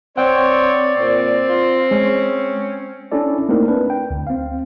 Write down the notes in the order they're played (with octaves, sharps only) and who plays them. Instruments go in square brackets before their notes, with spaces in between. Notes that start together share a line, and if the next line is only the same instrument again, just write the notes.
[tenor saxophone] C4 [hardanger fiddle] C#5 [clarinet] D5 [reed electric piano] F#5 G5
[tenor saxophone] A#2 [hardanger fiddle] C4
[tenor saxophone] F4
[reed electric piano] G#3 [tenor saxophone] C#4
[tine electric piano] C#4 D4 E4 A4 D5
A3 A#3 C4 D#4 E4 A#4
D4 B4
G5
D2
C4 F5